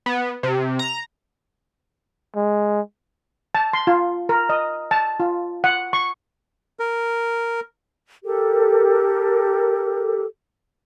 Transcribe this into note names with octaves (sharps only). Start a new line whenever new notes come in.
B3
C3
A#5
G#3
A5
C6
F4
A#4
D#5
A5
F4
F#5
C#6
A#4
G4 A4 A#4